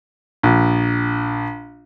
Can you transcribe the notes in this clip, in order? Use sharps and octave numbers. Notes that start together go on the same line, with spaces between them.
A#1